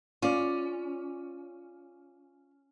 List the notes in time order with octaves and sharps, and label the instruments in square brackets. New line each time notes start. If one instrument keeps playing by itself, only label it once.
[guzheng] C#4 [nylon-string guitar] F4 D5